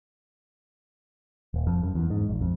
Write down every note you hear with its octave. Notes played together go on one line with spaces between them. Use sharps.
D#1
F2
F#2
E2
G#2
A#1
F2